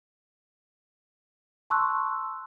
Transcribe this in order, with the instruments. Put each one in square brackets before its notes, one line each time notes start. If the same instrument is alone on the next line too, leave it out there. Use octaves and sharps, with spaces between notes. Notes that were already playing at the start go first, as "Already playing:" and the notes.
[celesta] A5 C6 C#6 E6 F#6